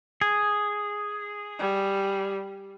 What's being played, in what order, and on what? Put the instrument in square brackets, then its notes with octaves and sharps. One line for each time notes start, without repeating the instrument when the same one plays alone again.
[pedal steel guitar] G#4
[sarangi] G3